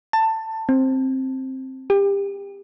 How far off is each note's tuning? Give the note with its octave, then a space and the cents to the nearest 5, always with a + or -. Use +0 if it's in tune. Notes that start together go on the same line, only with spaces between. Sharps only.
A5 +15
C4 +10
G4 +25